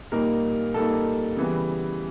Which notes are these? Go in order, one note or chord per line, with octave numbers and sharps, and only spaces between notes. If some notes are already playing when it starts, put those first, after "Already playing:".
A#2 G3 A#3 D#4 A#4
A#2 G3 A#3 D#4 A4
C#3 E3 G3 B3